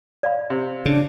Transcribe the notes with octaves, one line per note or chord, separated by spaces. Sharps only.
D5 F5 B5
C3
C#3 D4